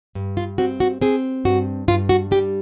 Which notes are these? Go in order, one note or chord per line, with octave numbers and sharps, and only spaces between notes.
G2
F4
C4 F#4
F#4
C4 G#4
G2 F#4
G2 F4
F#4
G3 G4